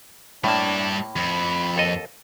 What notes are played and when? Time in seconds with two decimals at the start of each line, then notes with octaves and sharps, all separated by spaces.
0.44 A2 G3 A#3 D4 A5
1.16 F2 B5
1.76 D#2 A4 D#5